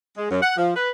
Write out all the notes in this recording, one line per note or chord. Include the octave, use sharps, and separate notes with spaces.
G#3
F#2
F#5
F3
B4